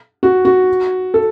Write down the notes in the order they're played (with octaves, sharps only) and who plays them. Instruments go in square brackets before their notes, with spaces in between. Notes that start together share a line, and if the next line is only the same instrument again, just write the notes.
[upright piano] F#4
F#4
A4